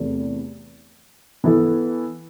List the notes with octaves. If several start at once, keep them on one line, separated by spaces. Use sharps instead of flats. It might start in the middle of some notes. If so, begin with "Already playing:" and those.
Already playing: E2 C3 E3 A3
E3 B3 E4 A4